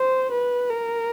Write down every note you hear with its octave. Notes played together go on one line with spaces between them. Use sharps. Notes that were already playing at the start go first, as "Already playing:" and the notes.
Already playing: C5
B4
A#4